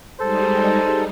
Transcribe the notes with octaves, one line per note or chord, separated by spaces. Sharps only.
G3 G#3 D#4 A4 C5